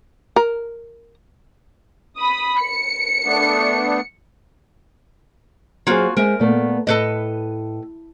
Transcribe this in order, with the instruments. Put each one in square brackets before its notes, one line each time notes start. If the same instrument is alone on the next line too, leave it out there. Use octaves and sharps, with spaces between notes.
[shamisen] A#4
[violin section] B5 D#6
C#7
[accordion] A3 B3 D4
[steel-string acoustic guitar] F#3 C4 G#4 [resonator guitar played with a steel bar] A#3 F4 F#4
[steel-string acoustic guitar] G#3 C4 E5 [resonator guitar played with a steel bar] A#4
[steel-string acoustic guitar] A#2 A3 B3
[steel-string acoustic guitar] A2 [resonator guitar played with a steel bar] A4 B4 D#5